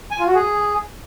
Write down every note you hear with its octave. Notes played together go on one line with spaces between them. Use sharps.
G#5
F4
F#4
G#4